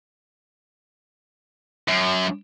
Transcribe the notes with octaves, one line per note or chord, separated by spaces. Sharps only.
F#2